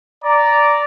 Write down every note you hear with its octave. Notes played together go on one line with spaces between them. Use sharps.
D5 A#5